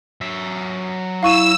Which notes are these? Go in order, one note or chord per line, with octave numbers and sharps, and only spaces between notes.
F#3 E5
E4 F5 C#6 E6 D#7